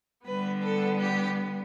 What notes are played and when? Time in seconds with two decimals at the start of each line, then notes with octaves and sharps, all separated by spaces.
0.25 D3 G3 B3 B4
0.63 A4
1.00 G4